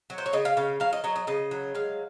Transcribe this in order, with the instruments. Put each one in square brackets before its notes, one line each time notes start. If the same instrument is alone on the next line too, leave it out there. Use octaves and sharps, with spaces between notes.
[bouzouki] F#3
C5
C#5
C#3 D#5
F5
C#3 F5
F#3 F5
D#5
F#3 D#5
D#5
C#3 D#5
F#3
G#3 F5